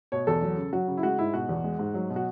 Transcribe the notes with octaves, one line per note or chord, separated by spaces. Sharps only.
B2 C#5
E2 A4
F#3
C#3
F#3 F#4
C#3
E4
G#3 F#4
G#2 E4
B2 F#4
E2
G#3
G#2
F#3
B2
F#4